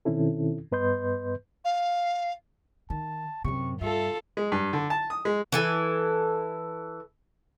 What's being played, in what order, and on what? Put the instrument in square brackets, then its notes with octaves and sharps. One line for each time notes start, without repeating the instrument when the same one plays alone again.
[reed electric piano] B2 D#3 C4 C#4 E4 A4
G2 B3 B4 D#5 C6 G6
[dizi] F5
[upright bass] D#3 [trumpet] A5
[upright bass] F#2 C3 [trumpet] C#6
[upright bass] G2 [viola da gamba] F4 A4 [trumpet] E5
[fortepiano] G#3
G2
D3
A5
D#6
G#3
[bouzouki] E3 A4 G#5